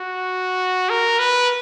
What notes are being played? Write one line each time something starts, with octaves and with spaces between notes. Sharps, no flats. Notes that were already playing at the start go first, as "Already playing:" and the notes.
Already playing: F#4
A#4
B4